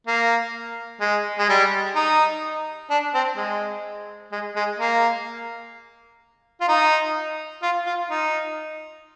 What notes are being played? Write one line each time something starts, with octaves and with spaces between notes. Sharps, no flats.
A#3
G#3
G#3
G3
D#4
D4
C4
G#3
G#3
G#3
A#3
F4
D#4
F4
F4
D#4